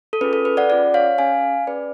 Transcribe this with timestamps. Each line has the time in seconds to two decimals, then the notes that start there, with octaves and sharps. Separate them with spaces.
0.13 A4
0.21 C#4 F4 G#4 B4
0.33 A4
0.45 B4
0.57 D5 F#5
0.70 C#4 F4 G#4 D5 F#5
0.94 C#5 F5
1.18 C#4 G#4 F5 G#5
1.67 C#4 G#4 B4 D5